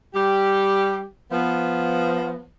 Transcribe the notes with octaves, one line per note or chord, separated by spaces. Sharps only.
G3 G4
F3 B3